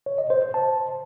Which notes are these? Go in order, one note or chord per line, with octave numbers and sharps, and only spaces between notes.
C#5
D#5
C5
C5
A5